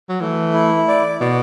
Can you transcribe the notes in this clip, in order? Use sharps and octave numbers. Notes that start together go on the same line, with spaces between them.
F#3
E3 A3
E4
D5
B2 D5